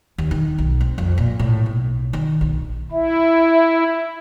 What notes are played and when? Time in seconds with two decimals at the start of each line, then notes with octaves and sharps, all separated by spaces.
0.18 D#2
0.31 D#3
0.58 B1
0.81 C4
0.98 F2
1.18 A#2
1.39 A2
1.66 B1
2.13 D#3
2.41 A#1
2.92 E4 E5